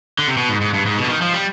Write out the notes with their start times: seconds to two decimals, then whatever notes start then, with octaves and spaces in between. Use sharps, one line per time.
0.19 D3
0.28 C3
0.37 B2
0.49 G#2
0.61 G#2
0.74 G2
0.86 G#2
0.97 B2
1.04 D3
1.09 D#3
1.22 F3
1.33 G3